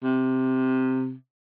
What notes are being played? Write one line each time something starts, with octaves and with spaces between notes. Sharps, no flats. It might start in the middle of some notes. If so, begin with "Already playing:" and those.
C3